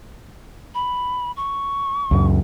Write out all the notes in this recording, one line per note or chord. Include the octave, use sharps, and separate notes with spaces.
B5
C#6
C#2 F#2